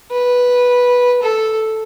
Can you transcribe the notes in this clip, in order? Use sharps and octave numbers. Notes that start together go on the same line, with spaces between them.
B4
A4